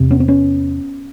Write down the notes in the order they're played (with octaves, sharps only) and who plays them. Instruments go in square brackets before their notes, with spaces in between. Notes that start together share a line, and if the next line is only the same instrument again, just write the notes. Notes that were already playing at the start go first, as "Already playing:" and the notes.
Already playing: [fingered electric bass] E2 C3
B3 C#4
C4
B3 C#4